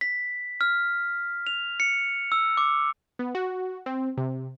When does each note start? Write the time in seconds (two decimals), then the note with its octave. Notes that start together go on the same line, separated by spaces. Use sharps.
0.01 B6
0.61 F6
1.47 F7
1.80 C#7
2.32 E6
2.57 D6
3.19 B3
3.35 F#4
3.86 C4
4.17 C3